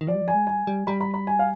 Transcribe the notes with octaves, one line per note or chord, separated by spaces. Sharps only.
D#3
F3 D5
G3
F3
G#5
G#3
G3 G#5
G3
G3 B5
B5
B5
G#5
F5